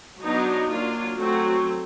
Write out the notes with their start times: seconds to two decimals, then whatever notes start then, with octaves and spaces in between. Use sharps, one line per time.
0.22 F#3 B3 D4 D#4
0.69 F#3 A#3 D4 F4
1.18 F#3 A3 C4 F#4